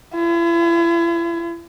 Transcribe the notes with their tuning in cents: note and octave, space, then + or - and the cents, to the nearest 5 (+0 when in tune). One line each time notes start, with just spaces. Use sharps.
E4 +40